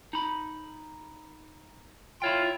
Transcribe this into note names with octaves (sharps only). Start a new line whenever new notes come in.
D#4 B5
E4 F4 C#5 G5